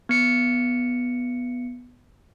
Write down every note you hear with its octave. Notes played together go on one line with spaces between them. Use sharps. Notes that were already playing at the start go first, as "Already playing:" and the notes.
B3 C#7